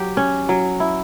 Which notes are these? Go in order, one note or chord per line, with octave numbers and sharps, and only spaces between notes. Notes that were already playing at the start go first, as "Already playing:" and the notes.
Already playing: F#3 G4
C#4
F#3
E4